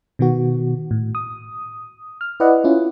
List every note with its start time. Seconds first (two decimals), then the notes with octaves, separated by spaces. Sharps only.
0.19 B2 D#3 B3 F#4
0.91 A2
1.15 D#6
2.21 F6
2.40 E4 B4 D5 D#5 F#5
2.64 C#4 E4 F4